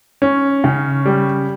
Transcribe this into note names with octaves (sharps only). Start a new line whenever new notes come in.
C#4
C#3
G3